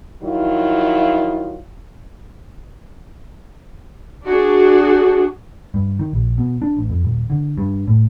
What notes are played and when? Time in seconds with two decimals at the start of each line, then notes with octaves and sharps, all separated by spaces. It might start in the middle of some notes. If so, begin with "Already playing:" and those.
0.22 D#3 F3 F#3 E4 F4
4.27 D4 F#4 G#4
5.74 G2
5.99 D#3
6.13 A#1
6.38 B2
6.62 D4
6.77 A1
6.90 F2
7.05 D#1
7.30 D3
7.58 G2
7.87 A2